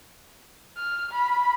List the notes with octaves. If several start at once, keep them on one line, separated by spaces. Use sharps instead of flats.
F6
B5